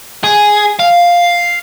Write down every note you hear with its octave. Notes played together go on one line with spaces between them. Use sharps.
G#4
F5